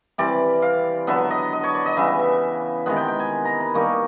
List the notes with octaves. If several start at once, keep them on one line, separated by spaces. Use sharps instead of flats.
C3 E3 G3 C4 D5
F5
D3 F#3 B3 E5
D#5
D#5
C#5
D5
D#5
C#3 E3 G3 B3 E5
E5
C3 D#3 G#3 B3 F#5
G5
G5
G#5
A#5
B5
D#3 G3 A#3 D#4 C#6